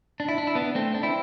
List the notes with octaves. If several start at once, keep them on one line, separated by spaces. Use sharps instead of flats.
D4
E4
D4
E4
B3 D4
A3 C4
D4
C4 E4